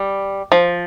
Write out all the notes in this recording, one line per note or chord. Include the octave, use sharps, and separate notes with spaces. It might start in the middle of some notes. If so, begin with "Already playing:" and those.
Already playing: G3
F3